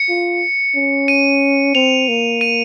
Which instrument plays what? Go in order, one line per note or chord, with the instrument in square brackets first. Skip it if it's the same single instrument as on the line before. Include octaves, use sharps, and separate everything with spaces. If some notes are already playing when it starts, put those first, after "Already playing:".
Already playing: [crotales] C#7
[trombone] F4
C#4
[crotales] D#7
[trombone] C4 [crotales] F7
[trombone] A#3
[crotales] D#7